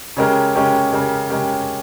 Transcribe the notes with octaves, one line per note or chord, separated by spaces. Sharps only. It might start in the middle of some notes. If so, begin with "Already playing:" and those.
C#3 G#3 C#4 G4 A#4
C#3 G#3 C#4 G4 A#4
C#3 G#3 C#4 G4 A#4
C#3 G#3 C#4 G4 A#4